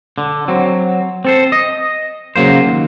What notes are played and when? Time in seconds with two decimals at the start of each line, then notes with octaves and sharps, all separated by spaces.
0.18 D3
0.48 F#3 C4
1.25 C4 A4 C5
1.52 D#5
2.36 C#3 F#3 A#3 C5
2.67 D#2